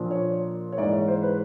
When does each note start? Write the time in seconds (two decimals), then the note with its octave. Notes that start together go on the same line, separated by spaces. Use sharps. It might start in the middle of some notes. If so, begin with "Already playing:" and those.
Already playing: A#2 F3 A#3 D4
0.11 C#5
0.72 C#5
0.78 G#2 E3 G#3 D5
0.93 C#5
1.08 C5
1.23 B4